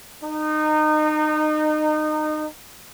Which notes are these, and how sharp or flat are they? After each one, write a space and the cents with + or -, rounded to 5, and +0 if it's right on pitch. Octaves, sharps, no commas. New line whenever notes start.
D#4 -25